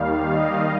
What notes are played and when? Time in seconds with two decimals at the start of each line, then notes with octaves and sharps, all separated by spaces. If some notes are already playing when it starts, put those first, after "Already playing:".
Already playing: D#2 D#3 G3 F5
0.33 D#5